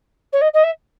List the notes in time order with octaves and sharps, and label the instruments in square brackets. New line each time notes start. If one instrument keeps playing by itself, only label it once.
[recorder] C#5
D#5
D#5
E5